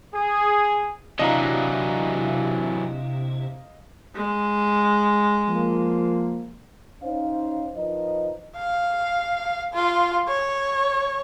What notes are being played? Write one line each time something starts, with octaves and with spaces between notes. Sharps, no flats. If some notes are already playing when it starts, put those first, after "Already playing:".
G#4
C3 E3 F#3 D4 E4 D#5 F5 A#5
G#3
F3 A#3
C#4 D#4 C5 F5
F3 D#4 A#4 B4 D#5
F5
F4
C#5